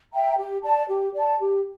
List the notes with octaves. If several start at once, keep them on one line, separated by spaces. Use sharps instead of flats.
E5 G5 A#5
G4
D5 A5
G4
D5 A5
G4